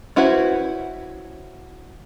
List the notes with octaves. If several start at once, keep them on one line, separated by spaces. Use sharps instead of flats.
C#4 E4 F#4 B4 C5